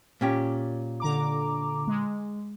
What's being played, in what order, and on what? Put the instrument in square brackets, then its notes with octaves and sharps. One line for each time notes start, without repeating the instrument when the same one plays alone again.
[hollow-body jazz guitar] A#2 C#4 G4
[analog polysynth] D3 A#5 D6
G#3